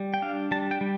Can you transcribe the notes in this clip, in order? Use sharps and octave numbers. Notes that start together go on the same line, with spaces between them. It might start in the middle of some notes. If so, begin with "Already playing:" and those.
Already playing: G3
G5
D4 F5
G3 A5
G5
G3